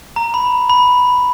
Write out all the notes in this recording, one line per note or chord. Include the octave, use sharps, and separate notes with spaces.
A#5
B5
B5